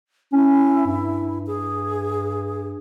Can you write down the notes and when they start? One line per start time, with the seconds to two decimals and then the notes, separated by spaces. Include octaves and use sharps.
0.33 C#4 E4
0.86 G2
1.47 G#4